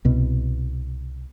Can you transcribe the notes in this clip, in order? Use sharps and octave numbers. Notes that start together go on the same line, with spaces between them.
C2 B2